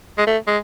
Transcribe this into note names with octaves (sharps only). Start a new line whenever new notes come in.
G#3
A3
G#3